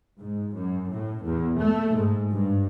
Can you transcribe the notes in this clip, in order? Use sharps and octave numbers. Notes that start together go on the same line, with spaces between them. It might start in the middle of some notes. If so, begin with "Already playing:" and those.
G#2
F#2
A2
E2
A3
G#2
G2